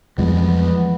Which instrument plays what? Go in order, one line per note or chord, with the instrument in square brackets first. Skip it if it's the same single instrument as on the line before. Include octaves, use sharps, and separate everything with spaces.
[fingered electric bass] F2 E3 [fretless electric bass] F3 G3 G#3 [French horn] B3